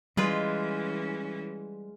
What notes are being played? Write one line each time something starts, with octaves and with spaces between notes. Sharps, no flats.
E3 G3 G#3 C#4 F4 B4